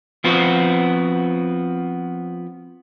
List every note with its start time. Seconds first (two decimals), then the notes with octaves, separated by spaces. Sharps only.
0.24 F3 B3 C4 F#4